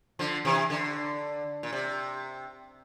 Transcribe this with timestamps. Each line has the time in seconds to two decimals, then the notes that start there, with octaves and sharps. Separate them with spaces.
0.19 D3 F3
0.45 C3 E3
0.70 D3
1.63 A#2
1.73 C3